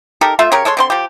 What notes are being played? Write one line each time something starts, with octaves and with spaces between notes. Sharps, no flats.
D#4 G4 A4 A#4
A3 F4 E5
C#3 G4 A#4 C#5
G#3 A4 C#5 C6
D3 C4 C6
F3 G4